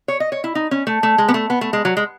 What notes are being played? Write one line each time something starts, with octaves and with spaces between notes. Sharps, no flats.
C#5
D#5
C#5
E4
D#4
C#4
A3
A3
G#3
B3
A3
B3
A3
G#3
F#3
G#3